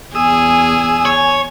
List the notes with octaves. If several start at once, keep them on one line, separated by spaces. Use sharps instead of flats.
E2 G#4 G#5 D#6 E6
C#5